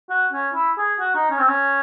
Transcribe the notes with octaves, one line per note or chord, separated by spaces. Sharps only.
F#4
C#4
E4
G#4
F#4
D#4
C#4
C4
C#4